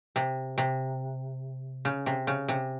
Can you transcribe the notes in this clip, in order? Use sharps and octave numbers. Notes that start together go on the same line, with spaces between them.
C3
C3
C#3
C3
C#3
C3